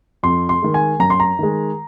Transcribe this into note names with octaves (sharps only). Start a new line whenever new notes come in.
F2 C6
C6
D#3 G#3
G#5
F#2 A#5
C6
A#5
D#3 G#3